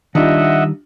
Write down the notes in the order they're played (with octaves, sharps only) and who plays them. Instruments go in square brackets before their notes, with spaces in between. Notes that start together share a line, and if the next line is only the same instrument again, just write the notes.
[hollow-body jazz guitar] D#3 G3 [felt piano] D4 F4 [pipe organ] D#5 E5 F#5